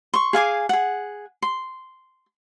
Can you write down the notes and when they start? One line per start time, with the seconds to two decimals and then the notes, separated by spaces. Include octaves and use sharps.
0.14 C6 C#6
0.33 G#4 F5 G#5 D6
0.69 G#4 F#5
1.42 C6